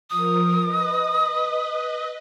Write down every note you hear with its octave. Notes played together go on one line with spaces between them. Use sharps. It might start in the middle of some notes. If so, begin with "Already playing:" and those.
F3 A#4 D#6
B4 D#5